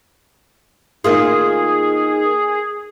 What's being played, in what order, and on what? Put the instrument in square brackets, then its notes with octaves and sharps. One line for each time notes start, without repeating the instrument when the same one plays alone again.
[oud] D#3 A#3 F4 [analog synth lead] G#4